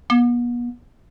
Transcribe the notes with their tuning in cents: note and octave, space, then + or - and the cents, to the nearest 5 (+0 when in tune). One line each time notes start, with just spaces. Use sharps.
B3 -40